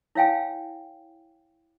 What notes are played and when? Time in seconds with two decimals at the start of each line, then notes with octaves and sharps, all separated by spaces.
0.15 E4 C#5 F5 G5 G#5